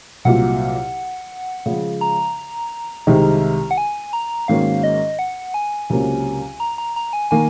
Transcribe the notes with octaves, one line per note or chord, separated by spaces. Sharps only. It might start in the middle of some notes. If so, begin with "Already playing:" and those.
C2 A#2 F#3 F#5
C#3 F3 G#3
A#5
C2 C3 D#3 G#3 D#4
F#5
G#5
A#5
G#2 D#3 A#3 C#4 F#4 F5
D#5
F#5
G#5
C#2 C3 F#3 A#3 C#4
A#5
A#5
A#5
G#5
D#3 A#3 G#5